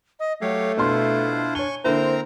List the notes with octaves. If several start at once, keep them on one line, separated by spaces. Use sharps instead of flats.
D#5
F#3 A3 G4 C#5 F5
B2 D4 E4 F4 C5 C6
C#5 G#5 C#6 G7
D3 A#3 C4 E4 A#4 C5 A#5